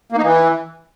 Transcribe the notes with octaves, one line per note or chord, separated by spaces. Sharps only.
A#3
D#4
E3